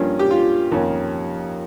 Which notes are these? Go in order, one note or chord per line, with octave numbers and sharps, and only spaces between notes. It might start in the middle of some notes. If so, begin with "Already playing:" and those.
Already playing: G2 F3 A#3 C#4
G4
F4
F2 D#3 A#3 C#4